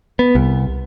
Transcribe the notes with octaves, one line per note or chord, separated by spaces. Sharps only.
B3
C2